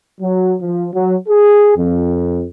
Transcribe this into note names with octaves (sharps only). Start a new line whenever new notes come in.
F#3
F3
F#3
G#4
F2